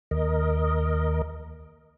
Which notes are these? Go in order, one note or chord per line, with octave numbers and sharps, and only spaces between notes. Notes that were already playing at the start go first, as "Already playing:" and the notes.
D#2 A#4 D#5